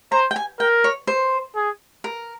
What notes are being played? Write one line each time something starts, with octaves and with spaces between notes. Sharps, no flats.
C5 A#5
G5
G#5
A#4 G5
C#5
C5
G#4
A#4